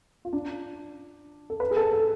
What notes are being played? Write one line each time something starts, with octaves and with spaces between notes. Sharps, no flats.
F4
D4
A4
B4
G#4
A4
A4